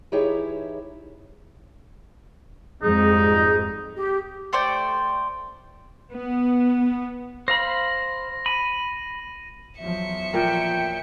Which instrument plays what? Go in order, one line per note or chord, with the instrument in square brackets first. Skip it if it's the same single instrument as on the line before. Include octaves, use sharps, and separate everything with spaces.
[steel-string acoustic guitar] E3 D#4 E4 G4 G#4 C#5
[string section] F2 G#2 G3 [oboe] D#4 [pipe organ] G#4
[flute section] G4
[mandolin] A3 C5 D5 G5
[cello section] B3
[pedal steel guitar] C5 F5 B5 [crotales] A#6
[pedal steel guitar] B5 [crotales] D#7
[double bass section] E2 F3 F#3 [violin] E5 C#7
[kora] A#2 A#4 [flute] G5